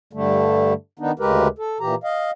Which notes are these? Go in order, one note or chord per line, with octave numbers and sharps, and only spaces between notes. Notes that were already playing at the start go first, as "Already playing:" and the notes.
G2 D3 G3 A3
D#3 B3 D4 D#4
D2 C#3 G#3 G4 A#4 B4
A4
A#2 E3 G4 A#5
D#5 F5